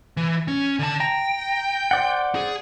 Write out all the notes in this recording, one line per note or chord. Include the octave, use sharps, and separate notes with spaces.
E3
C#4
D3 A5
G5 A#5
C5 D5 F#5
G#4